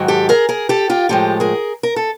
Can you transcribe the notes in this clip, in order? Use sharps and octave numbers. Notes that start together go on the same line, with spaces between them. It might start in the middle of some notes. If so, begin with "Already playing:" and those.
Already playing: G#2 D#3 F#3
G4 A4
G#4 A#4
G#4 A#4
G4 A4
F4 G4
A2 F3 G#3 G4 A4
G#4 A#4
A#4
A4